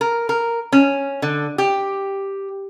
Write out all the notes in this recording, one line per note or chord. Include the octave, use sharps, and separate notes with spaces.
A#4
A#4
C#4
D3
G4